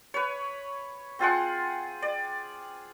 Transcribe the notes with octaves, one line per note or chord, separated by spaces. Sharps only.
B4 C#5
C4 F4 G#4 F#5
D5